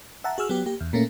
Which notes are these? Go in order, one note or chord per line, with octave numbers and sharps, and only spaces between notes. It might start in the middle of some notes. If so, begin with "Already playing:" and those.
E5 F#5 A5 A#5
F#4 G#4 E6 F6
F#3 B3 G4
A#3 G4
E2
A#2 A3 A#3 C#4